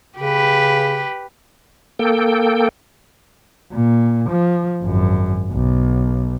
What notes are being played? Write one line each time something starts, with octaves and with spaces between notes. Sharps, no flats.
C#3 G4 B4
A#3 A4 G5
A#2
F3
G#1 F#2
B1